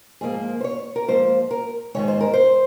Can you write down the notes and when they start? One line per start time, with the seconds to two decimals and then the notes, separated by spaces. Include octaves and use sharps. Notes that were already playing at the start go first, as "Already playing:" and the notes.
0.21 G#2 F3 A#3 G#4
0.60 C5
0.64 C#5
0.96 A#4
1.08 G#2 F3 A#3 C5
1.51 A#4
1.95 G#2 D#3 G#3 C#5
2.08 C5
2.21 A#4
2.34 C5